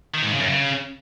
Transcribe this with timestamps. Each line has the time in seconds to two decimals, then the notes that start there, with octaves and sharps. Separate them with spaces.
0.14 D#3
0.23 G#2
0.31 C#3
0.40 F#2
0.48 C#3